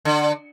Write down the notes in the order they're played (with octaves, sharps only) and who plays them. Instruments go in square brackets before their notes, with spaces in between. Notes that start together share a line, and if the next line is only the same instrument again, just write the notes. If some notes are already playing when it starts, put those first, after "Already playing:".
[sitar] D3